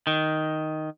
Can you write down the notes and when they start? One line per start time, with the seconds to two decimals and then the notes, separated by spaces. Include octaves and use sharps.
0.07 D#3